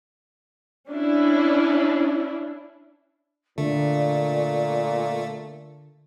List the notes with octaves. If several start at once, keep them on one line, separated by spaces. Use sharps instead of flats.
C#4 D4 E4
A#2 D3 A3 D5